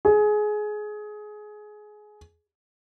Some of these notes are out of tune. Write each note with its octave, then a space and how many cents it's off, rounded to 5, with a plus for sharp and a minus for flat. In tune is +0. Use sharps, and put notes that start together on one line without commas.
G#4 +20